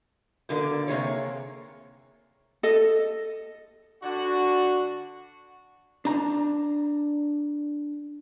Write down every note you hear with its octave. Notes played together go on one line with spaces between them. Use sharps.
B2 D3 A#3 D5
C3 A#3 G#4 C#5
A4 D#5
D3 D4 F#4
D4 A#5